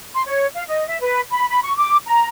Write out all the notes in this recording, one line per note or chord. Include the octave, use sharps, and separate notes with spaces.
C6
C#5
F5
D#5
E5
B4
B5
B5
C#6
D6
A#5